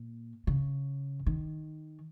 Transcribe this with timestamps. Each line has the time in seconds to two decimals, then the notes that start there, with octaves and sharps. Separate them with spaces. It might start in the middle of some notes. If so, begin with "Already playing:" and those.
Already playing: A#2
0.47 C#3
1.26 D#3